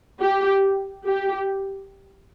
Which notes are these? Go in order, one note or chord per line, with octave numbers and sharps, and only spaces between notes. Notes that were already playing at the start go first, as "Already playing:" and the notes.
G4
G4